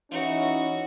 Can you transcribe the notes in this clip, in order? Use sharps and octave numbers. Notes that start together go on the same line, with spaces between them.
E3 C#4 D#4 F#4